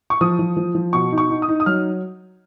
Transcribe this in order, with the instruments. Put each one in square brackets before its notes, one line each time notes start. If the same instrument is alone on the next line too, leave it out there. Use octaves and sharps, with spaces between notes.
[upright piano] C#6
F3 D#6
F3
F3
F3
B2 C#6
D#4
C#6
D#4
D#6
D#4
D#6
F#3 F6